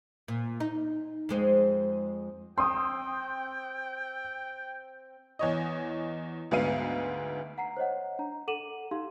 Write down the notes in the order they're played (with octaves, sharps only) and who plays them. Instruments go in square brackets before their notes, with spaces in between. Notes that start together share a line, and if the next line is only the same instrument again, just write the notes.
[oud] A#2
D#4
F2 G#3 C5
[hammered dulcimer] C4 [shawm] G5 [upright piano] C6 D#6
[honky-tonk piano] E2 C#5 D#5
D2 G#2 B3 E5 F5 D#7
[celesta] F#5 A#5 C7
C5 C#5 D#5 F#5
D4 A#5
A4 F#5 D6 D#7 E7 F#7
D#4 G4 F5 C6